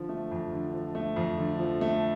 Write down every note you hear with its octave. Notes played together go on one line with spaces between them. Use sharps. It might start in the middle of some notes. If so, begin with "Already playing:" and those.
Already playing: D3 F3
A3
F2
D3
F3
A3
F2
D3
F3
A3